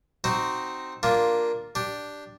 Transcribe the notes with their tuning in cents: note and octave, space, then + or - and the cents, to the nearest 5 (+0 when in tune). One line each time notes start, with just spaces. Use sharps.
C4 +0 D#4 -10 F#4 +10
A#3 +0 D4 +0 F4 +0
D4 +0 G4 +0